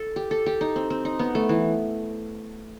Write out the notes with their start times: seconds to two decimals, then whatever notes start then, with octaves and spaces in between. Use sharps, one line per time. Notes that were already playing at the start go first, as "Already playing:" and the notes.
Already playing: A4
0.16 G4
0.31 A4
0.46 G4
0.61 D#4
0.76 C4
0.90 C4
1.05 D#4
1.19 B3
1.35 A3
1.49 E3